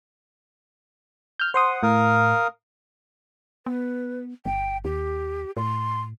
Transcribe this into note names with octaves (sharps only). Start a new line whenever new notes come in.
F6 G6
C5 F#5 C6 D#6
A2 A#4 F5 D#6
B3 B4
G1 G5
D#2 G4
A2 C6